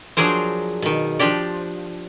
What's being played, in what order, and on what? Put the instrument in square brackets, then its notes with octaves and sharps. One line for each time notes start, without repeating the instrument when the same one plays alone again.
[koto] F3 F#3 D4 G#4 A#4 C5
B2 D#3
F3 D4 G4 D5